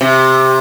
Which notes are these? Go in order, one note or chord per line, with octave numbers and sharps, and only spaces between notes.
C3